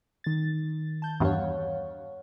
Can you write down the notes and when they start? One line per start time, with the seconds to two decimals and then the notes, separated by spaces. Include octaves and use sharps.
0.24 D#3 A6
1.02 A5 G6
1.20 E2 G2 C#5 F5 F#5